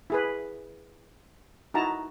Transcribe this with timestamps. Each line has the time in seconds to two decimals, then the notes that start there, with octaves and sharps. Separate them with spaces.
0.10 E4 G#4 B4
1.74 D#4 E4 F#4 A5 A#5